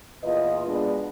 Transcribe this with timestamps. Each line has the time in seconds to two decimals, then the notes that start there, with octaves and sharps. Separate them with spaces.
0.24 E2 A#2 F4 B4 D#5
0.67 B2 G#3 B3 D4